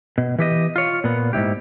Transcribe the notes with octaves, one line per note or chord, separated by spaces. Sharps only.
B2
E3 G4 D#5
F4 C#5
A#2 B3
G#2 C#3 E4 G4